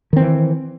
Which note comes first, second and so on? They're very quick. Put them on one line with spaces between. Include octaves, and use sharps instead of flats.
D#3 C4 E3